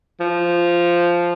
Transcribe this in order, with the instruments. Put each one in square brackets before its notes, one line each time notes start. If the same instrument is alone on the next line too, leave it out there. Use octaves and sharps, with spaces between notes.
[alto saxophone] F3